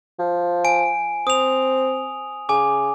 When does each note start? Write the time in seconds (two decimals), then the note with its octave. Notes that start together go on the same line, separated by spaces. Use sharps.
0.19 F3
0.65 G#5 D7
1.27 C4 D#6 F7
2.49 C#3 G#5 D6